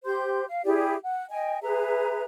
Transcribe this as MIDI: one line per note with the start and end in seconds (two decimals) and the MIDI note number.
0.05 0.44 67
0.05 0.44 72
0.05 0.44 84
0.05 0.44 91
0.48 0.61 77
0.65 0.95 64
0.65 0.95 67
0.65 0.95 68
0.65 0.95 74
1.03 1.25 78
1.30 1.59 75
1.30 1.59 79
1.30 1.59 80
1.63 2.24 68
1.63 2.24 71
1.63 2.24 76
1.63 2.24 82